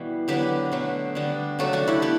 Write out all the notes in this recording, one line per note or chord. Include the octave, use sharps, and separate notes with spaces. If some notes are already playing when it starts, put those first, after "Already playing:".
Already playing: B2 E3 G3 B3
D3 F#3 B3 G4 B4
B2 F#3 A3
D3 G3 B3
C#3 F#3 A3 F#4 A4
D4 F#4
E4 G4
B3 G4 B4